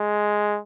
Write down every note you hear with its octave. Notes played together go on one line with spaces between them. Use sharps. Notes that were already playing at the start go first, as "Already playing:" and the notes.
Already playing: G#3